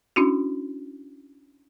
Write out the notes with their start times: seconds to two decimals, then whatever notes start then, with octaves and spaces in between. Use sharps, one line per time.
0.16 C#4 D4 E4 F#4